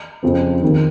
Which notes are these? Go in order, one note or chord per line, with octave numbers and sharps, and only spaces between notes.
F2 C#3 F3 C4
D#2 D#3